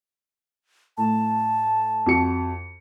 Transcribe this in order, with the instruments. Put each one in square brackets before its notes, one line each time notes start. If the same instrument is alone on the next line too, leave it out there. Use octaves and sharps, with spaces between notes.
[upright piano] A2 [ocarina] A5
[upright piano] F2 F#4 C#7